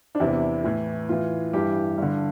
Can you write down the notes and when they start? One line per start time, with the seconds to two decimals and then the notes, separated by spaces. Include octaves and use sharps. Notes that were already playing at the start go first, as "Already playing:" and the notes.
0.15 D4
0.20 E2 C3 E3 E4
0.64 A2 E3
1.09 A2 E3 F4
1.53 G2 E3 G4
1.98 G2 D3